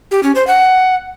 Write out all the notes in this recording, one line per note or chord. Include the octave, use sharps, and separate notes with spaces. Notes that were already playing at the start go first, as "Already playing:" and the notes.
G4
C#4
C5
F#5